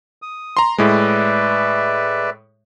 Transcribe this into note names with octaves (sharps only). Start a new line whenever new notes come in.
D#6
A#5 C6
A2 G#3 B4 D5 E5